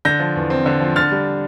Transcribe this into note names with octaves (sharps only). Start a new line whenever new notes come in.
D3 G6 A#6
F3
E2
C4
D3
F3
D3 F6 A6
G3